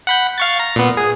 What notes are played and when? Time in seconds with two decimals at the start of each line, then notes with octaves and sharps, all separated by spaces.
0.07 F#5 B5 G6
0.38 F5 C#6 A6
0.59 A#5
0.76 A#2 B3
0.97 G#4